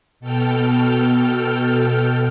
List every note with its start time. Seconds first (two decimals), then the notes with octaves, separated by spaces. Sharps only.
0.20 B2 A4 G5 F6